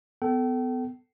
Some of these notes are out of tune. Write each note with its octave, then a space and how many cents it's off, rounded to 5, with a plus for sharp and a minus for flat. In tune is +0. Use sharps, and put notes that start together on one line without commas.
B3 +25 A4 +0 G5 -35